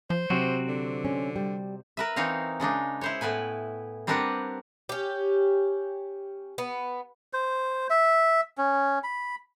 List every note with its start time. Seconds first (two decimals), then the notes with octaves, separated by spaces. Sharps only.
0.10 F3 C5
0.30 C3 F#3 C4 F#4
0.68 D3
1.05 C#4
1.36 G3
1.97 A#4 B4 E5
2.16 E3 C4 D#4 C#5 F5
2.60 C#3 G#3 D4 D#4
3.01 E4 C5 C#5
3.21 A2 B3 E4 B4 G#5
4.07 G3 C4 D4 A#4 B4 F#5
4.89 C#4 G4
6.58 B3
7.33 C5
7.90 E5
8.58 C#4
9.03 B5